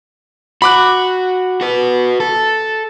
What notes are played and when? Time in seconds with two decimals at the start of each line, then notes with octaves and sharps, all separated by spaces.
0.62 F#4 B5 D6 F#6
1.61 F#4 B4
2.20 A4